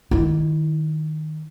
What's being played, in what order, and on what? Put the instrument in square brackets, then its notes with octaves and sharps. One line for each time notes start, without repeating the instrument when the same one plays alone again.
[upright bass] D#3 E4